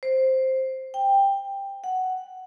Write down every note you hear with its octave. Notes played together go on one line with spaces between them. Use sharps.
C5
G5
F#5